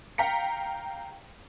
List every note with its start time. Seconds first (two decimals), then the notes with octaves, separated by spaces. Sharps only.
0.18 F5 G5 A#5 B6 C#7